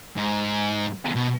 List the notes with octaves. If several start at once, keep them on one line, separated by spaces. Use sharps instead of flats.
G#2
B2